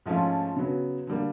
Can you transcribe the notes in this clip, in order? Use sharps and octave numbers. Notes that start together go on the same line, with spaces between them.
G#2 F3 A3 C#4 F4
C#3 F#3 B3
D3 G3 A#3